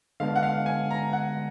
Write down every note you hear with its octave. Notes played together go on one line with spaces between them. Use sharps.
D3 G#3 B3 D4 F5
F#5
F5
G#5
A#5
F#5